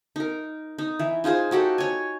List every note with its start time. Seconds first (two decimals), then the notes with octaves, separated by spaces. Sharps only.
0.16 D#4 A#4
0.78 D#4
0.99 E3
1.24 D#4 F4 G#4 C5
1.51 D#4 F#4 G4 A4
1.78 C#5 G#5